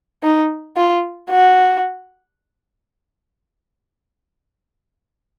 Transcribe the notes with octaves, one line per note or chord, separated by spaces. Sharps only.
D#4
F4
F#4